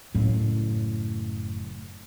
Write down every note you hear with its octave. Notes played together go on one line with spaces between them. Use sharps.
F#1 A2